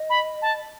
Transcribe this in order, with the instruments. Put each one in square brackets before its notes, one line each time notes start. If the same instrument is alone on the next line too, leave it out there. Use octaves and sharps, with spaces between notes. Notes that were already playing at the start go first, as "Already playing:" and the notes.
Already playing: [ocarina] D#5
[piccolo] B5
A5